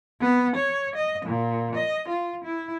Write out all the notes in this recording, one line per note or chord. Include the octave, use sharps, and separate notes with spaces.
B3
C#5
D#5
A#2
D#5
F4
E4